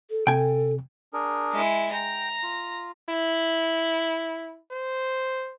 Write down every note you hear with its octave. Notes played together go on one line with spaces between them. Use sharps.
A4
C3 A4 G5 G#5
D4 G#4 A#4
G#3 E4
G5 A#5
F4
E4
C5